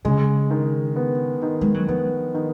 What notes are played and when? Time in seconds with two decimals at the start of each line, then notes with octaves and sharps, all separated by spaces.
0.05 C#3 G#3
0.51 D#3
0.96 B3
1.42 D#3
1.61 G#3
1.74 F#3
1.88 F3 B3
2.34 D#3